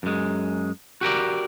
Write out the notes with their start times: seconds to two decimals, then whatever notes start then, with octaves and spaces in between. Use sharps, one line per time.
0.03 F#2 G#3
1.01 F#4 G4 A#4 D5